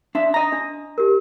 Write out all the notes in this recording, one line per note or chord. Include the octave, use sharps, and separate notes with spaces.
D4 E5 C6
D#5 A#5
D4
G4 A#4